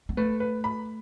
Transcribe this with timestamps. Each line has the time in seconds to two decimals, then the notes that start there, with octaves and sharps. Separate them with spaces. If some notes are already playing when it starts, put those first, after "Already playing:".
0.09 B3
0.17 A3 B4
0.40 B4
0.64 B5